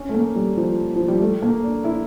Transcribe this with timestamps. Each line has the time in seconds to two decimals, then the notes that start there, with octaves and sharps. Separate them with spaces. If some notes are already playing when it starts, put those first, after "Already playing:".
Already playing: C#4
0.09 A3
0.14 A#3
0.36 G3
0.57 F3
0.95 F3
1.08 G3
1.21 A3
1.42 A#3
1.64 D4
1.84 E4